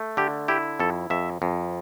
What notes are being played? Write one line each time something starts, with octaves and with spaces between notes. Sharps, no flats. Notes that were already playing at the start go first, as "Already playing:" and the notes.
Already playing: A3
D3 G4
E4 G4
F2 A4
F2 E5
F2